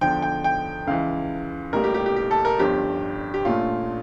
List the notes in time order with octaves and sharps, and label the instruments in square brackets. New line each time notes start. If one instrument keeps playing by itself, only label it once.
[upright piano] E2 D3 F3 G5
G5
G5
C#2 C#3 E3 F5
A1 A2 G3 A#3 A#4
G4
G4
G4
G4
A4
A#4
G1 G2 F3 C#4 G4
G4
A#1 A#2 A3 C#4 F4